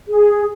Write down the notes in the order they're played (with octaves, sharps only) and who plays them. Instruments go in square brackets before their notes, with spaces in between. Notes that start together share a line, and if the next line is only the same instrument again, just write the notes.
[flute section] G#4